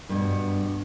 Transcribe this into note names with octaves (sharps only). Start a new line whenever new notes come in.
G2 B2